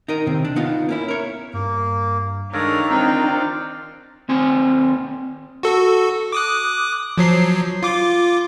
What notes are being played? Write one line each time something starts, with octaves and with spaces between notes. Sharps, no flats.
D#4 A#4 D#5
C3 D#3 C4
D4
B3 D#4 F4
A#3 C#4 E4
A#4 C#5
G2 A#3
D#3 G#3 D4 D#4 A4 A#4 C#5 F5
C4 D4 F4 G5
D#2 C4 G#5
F#4 A4
D6 D#6 F#6
F3 F#3 C7
F4 D6